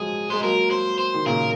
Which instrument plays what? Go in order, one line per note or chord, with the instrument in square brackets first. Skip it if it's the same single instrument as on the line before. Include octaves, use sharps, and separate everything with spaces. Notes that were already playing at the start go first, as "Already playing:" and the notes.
Already playing: [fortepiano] F3 F#3 G#3 [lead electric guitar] G#4
[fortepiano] G#3 [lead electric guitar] C5
[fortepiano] F#3 A#3 [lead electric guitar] A#4
[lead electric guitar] C5
C5
[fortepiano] D#3
[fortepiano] A#2 C#3 [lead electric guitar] A#4